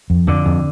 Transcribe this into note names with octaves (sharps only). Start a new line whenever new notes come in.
F2
F2 D3
F2